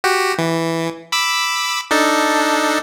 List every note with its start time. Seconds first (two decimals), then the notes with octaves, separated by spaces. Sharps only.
0.04 F#4 G4
0.38 E3
1.12 B5 D6 E6
1.91 D4 D#4 A4